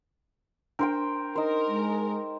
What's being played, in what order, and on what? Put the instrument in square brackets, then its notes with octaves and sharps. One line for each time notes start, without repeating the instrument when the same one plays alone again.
[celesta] D4 [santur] A#4 C5 G5
[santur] D#4 C5 [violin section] A#4
[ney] G#3